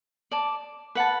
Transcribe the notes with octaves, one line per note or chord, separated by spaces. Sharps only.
D5 A5 D6
B4 F#5 A5